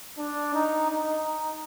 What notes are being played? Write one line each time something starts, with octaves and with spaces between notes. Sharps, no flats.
D4
D#4
D#4